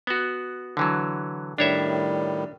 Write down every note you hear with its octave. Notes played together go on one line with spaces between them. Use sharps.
B3 F#4
D3 E3 F#3
A2 D#3 G3 D4 C#5 E5